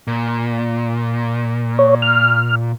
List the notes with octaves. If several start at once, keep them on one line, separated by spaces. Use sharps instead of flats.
A#2
C#5
F6